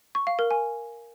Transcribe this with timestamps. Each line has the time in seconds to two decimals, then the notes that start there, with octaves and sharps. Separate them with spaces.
0.15 C#6
0.27 F5
0.39 A#4
0.51 G#5